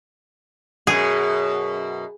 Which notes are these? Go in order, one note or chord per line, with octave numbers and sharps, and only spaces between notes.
F#2 B2 G#4